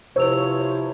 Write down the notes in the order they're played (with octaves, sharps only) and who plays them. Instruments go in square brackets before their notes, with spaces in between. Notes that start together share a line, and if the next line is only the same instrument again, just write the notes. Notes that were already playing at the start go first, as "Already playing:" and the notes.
[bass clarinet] C3 [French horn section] F3 E4 [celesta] B4 E6 F7 [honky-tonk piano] C#5